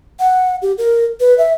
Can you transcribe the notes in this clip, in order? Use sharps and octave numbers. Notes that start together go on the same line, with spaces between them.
F#5
G4
A#4
B4
E5